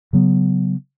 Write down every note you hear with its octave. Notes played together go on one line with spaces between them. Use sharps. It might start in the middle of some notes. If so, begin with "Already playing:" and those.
C#3 F#3 B3